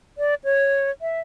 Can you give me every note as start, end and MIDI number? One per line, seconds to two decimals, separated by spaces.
0.18 0.34 74
0.44 0.91 73
1.01 1.21 76